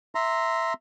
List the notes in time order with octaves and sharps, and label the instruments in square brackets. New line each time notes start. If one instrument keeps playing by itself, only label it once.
[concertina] E5 A#5 C6